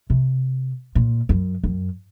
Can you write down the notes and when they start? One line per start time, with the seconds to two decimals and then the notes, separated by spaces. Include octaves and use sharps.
0.10 C3
0.95 A#2
1.29 F#2
1.64 F#2